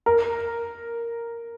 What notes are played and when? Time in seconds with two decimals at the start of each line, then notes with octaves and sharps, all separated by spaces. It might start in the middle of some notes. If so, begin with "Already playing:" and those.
0.06 A#4